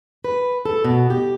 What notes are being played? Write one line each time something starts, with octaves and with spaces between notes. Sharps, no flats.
B4
A4
B2
G4